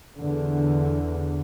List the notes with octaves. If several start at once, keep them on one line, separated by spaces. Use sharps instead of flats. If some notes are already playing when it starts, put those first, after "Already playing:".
E2 D3